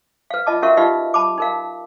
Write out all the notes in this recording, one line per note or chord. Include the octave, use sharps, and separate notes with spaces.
B4 F5
F4 D#5 A5 D6
C#4 F#4 A#4 E5 F5 C#6
D#4 F4 G4 B4 D#5 F5
A5 B5 D6
D#4 A#4 F5